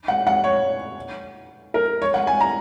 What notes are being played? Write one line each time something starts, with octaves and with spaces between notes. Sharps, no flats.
F#5
F#5
C#5
A#4
C#5
F#5
G#5
A#5